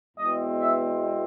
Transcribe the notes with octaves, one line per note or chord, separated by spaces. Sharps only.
E2 B2 G#3 C4 D#5
E5